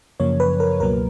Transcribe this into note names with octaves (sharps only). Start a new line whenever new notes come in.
F#2 C#3 F3 A#3 C#5
B4
A#4
C#2 B2 F#3 A#3 A#4